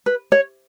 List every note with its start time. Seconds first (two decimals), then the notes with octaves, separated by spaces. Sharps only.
0.06 B4
0.32 C#5